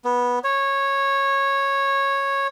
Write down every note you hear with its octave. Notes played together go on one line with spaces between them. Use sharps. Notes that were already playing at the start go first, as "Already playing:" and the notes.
B3
C#5